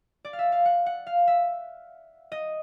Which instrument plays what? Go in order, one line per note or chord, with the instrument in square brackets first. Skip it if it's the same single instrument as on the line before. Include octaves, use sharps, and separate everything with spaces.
[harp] D5
F5
E5
F5
F#5
F#5
F5
E5
D#5